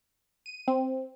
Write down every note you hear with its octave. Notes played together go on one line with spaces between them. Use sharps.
D#7
C4